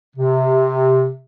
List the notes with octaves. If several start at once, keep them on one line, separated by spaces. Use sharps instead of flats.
C3